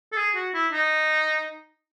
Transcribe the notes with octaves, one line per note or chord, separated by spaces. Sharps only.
A4
G#4
F#4
E4
D#4